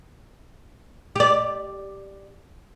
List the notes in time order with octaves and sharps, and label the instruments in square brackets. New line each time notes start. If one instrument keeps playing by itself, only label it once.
[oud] G4 D5